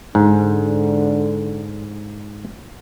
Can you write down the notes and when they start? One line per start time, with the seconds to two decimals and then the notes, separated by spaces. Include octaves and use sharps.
0.15 G#2 D3